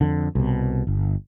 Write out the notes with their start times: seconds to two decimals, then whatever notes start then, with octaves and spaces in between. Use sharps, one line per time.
0.01 F2 D3
0.35 C2 B2
0.87 G1